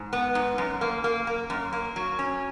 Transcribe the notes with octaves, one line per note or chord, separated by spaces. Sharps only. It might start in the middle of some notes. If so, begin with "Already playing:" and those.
Already playing: G#2
B3
G#2
F#2
A#3
A#3
A#3
F#2
A#3
F#3
C#4